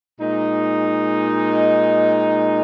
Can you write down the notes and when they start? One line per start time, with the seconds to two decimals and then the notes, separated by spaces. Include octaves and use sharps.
0.19 A#2 G#3 D#4